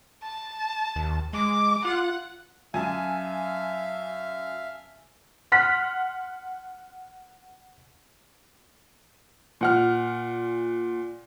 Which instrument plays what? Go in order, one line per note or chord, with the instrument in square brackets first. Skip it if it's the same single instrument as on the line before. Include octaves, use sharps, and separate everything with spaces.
[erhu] A5
[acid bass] D#2
[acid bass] G#3 [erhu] D6
[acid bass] F4 [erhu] F#5
[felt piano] F#2 [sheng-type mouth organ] E5 F5 [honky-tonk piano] G#5 A5
[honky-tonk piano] F#5 C6 F6 F#6 B6
[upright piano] A#2 F#5 F6